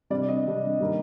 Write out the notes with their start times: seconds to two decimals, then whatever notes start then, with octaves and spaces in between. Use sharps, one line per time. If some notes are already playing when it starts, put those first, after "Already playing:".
0.10 C3 G3 D4 D5
0.29 D#5
0.46 C3 G3 D4
0.80 D#3 G3 A#3